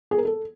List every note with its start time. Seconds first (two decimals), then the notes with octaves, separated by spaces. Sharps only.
0.11 G#4
0.18 A#4
0.25 A4